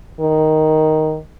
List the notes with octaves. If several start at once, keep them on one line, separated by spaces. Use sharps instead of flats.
D#3